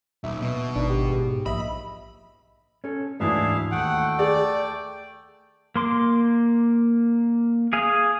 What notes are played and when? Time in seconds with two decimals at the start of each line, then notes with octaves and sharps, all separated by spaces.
0.24 D#1 B1 E5
0.42 B2
0.76 G#1 D4 D#4
0.90 G4
1.09 G#2
1.46 A#1 D#5 E5 B5
2.84 C#4 A4
3.20 D2 G#2 E3 D4 E4 G#4 E5 F5
3.72 D#2 A3 F#5 G5
4.19 G#4 D5
5.76 A#3 C6 D6
7.73 G#4 F5 G#5